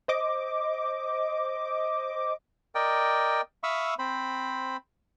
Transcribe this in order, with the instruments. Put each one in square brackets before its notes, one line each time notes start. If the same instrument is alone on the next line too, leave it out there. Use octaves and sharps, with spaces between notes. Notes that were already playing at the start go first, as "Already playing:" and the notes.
[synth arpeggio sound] C5 D#5 D6
[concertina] A#4 D5 D#5 G5
E5 F5 B5 C#6 D#6 E6
C4 C5 B5